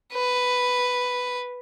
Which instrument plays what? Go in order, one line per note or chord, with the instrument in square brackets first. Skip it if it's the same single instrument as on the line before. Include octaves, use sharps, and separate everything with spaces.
[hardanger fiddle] B4